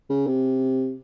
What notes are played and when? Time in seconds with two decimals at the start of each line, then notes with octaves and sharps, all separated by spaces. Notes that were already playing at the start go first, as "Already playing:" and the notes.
0.10 C#3
0.27 C3